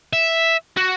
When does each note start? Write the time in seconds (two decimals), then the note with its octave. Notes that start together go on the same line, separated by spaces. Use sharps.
0.13 E5
0.77 F#4